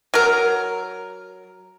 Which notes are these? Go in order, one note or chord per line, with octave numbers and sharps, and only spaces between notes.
F#3 A#4